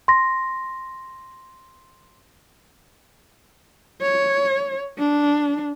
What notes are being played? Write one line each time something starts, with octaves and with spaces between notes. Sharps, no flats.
C6 A#6
C#5
D4